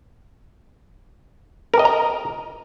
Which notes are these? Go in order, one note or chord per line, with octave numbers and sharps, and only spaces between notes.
A#4
D#5
A#5